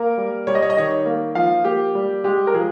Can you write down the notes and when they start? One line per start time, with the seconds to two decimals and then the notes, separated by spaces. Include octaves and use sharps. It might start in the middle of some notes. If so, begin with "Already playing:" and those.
Already playing: A#3 A#4
0.18 G3
0.47 G3 C#5
0.55 D#5
0.62 C#5
0.70 D#5
0.77 D#3 C#5
1.06 A#3
1.35 F3 F5
1.65 A#3 G4
1.95 G3
2.24 G#3 G4
2.47 A#4
2.54 F3 G#4